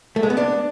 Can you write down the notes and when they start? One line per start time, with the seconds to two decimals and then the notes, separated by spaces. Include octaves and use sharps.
0.16 A3
0.23 G#3
0.30 B3
0.37 D4